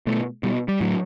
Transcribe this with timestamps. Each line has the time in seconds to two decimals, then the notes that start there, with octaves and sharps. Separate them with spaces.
0.07 B2 A3
0.43 B2 G3
0.68 G3
0.81 A2 F#3